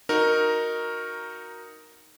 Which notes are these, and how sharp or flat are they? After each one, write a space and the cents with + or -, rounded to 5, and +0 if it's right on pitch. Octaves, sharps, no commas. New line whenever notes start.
D#4 +5 F#4 -10 A#4 +0